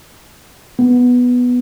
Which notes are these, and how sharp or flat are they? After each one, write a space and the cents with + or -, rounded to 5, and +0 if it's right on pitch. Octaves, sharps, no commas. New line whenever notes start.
B3 +0